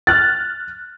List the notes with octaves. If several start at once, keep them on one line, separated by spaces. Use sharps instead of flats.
F6 F#6 A6